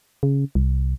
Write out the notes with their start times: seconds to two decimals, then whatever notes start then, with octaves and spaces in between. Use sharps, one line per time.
0.23 C#3
0.55 C2